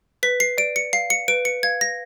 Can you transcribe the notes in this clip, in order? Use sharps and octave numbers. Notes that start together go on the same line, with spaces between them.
B4 B6
C7
D5 D7
C#7
F5 C7
C#7
B4 D7
C#7
F5 G#6
A#6